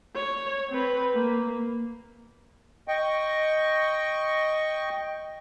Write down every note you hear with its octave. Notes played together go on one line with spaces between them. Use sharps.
C#5
C4 B4
A#3
D#5 G5 C#6